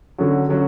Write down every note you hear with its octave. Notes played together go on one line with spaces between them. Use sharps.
D3 F#3 C#4 F#4
D3 F#3 C#4 F#4